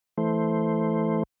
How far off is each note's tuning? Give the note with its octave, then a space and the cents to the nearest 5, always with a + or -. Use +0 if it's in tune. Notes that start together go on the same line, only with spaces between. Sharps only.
E3 +0 A3 +0 C5 +0